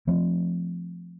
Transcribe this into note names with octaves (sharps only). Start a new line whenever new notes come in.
F3 A3 C4